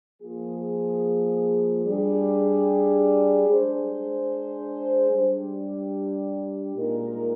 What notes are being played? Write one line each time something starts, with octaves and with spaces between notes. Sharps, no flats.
F3 A#3 F4 G#4
G3 D4 G#4
G#3 D4 G#4 C5
G3 D4 G4
A#2 G#3 D#4 A#4